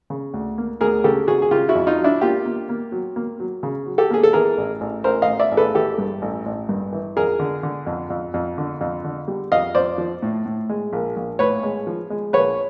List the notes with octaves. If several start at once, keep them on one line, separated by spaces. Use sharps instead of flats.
C#3
D2
A#3
D2 G#4 A#4
C#3 G4 A4
C#3 F#4 G#4
G#4
C#3 F4 G4
E4 F#4
F2
D#4 F4
F#3
D4 E4
A#3 F4 G4
A#3
A#3
F#3
A#3
F#3
C#3
F#3
G4 A4
A#3 G#4
A4
E3 G#4 A#4
A1
A1
A1 A#4 C5
D#5 F5
A1
D5 E5
A1
A4 B4
E3 G4 A4
G2
A1
A1
G2
E3
F2 G#4 A#4
D3
D3
F2
F2
F2
D3
F2
D3
G3
F2 D#5 F5
F2 C5 D5
F3
A2
A2
G#3
A#1
A#1
A2 B4 C#5
G#3
F3
G#3
A#1 B4 C#5